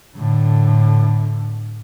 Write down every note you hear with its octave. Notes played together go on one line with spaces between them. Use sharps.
A2 D3